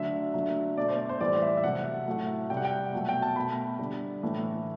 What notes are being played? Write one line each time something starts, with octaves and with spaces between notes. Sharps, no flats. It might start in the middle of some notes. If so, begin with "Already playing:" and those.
Already playing: D3 F#3 A3 E5
D3 F#3 A3
B2 A3 D5
C5
D5
C5
A2 E3 G3 D5
E5
E5
C3 F#3 A3 F#5
A2 F#3 A3
C3 G3 G5
F#5
G5
B2 F#3 A3
G5
A5
B2 A3 B5
D3 G3
A2 E3 A3